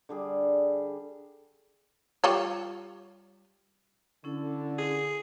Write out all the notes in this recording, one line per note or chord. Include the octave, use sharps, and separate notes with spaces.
D3 G3 G#4
G3 F4 C#5
D3 C#4 E4 A4
G#4